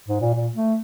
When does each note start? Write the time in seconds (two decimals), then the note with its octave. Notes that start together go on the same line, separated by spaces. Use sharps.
0.08 G#2
0.21 A#2
0.35 A#2
0.55 A3